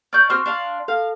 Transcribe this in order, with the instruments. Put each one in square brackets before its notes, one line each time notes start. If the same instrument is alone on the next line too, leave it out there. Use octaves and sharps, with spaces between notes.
[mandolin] D5 G6 [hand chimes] C#6 F6
[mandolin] C4 F#4 F6 [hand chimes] C6
[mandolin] D4 F5
[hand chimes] A4 [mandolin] F5